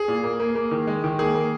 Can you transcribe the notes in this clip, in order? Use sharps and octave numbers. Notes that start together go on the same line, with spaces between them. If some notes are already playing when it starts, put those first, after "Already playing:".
Already playing: G#4
A#2
A#3
A#3
A#3
D#3
G#3
D#3
A#3 G#4
A#3